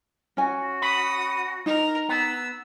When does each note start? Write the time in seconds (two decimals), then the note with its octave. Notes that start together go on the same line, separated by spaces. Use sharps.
0.37 C#4 F#4 G#5
0.82 F#5 B5 D#6
1.66 D#4 A#4 A#5
2.09 B3 E6